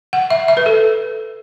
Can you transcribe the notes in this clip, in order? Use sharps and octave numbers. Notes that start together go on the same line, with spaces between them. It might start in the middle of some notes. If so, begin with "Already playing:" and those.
F#5
E5
E5
B4
A4